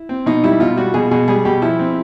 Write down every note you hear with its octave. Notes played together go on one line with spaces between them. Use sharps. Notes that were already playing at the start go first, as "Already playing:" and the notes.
Already playing: E4
C4
B2 D#4
G3 E4
B2 F4
G3 F#4
B2 G#4
B2 G#4
G3 G#4
B2 G4
F3 E4
C4